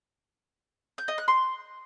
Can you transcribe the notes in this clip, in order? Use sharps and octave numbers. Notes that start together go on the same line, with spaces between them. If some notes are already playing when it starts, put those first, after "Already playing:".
G6
D#5
F#6
C6